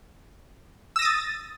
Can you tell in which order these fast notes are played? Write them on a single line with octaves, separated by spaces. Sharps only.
E6 A#6 D#6 A6